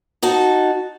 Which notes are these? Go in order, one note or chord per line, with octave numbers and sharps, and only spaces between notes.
D#4 F#4 A5